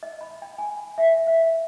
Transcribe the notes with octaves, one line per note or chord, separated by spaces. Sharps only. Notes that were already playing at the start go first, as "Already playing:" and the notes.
D#5
B5
G5
G#5
E5
F5